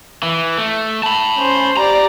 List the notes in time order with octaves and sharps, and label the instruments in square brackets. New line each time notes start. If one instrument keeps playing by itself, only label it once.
[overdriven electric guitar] E3
A3
A5 B5
[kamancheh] C#4 C5
[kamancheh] G4 D5 [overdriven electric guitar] A#5